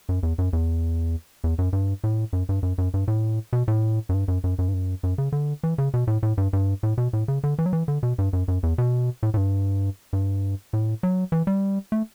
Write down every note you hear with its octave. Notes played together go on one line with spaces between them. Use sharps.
F#2
E2
F#2
E2
E2
F#2
G2
A2
F#2
G2
F#2
F#2
G2
A2
B2
A2
F#2
G2
F#2
F#2
F#2
G2
F#2
F#2
C#3
D3
E3
C#3
B2
A2
A2
G2
G2
A2
B2
A2
C#3
D3
E3
F#3
E3
D3
B2
G2
F#2
F#2
E2
B2
A2
A2
G2
G2
A2
F#3
E3
G3
A3